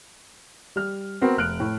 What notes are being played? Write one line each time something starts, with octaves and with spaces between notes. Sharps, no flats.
G3 F6
B3 C4 F#4 A#4 B4
F1 F6 F#6 D7
A2